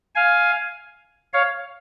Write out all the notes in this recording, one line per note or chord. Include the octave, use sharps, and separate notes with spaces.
F5 G#5
C#5 F5